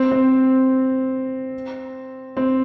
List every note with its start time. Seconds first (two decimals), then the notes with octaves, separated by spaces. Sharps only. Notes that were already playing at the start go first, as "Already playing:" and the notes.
Already playing: C4
0.11 C4
2.37 C4